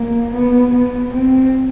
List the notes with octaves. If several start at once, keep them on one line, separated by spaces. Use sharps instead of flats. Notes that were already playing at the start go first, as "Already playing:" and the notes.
Already playing: A#3
B3
B3
C4